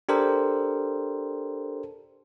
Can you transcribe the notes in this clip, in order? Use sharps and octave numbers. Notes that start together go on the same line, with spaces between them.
D4 G4 A4 A#4 C5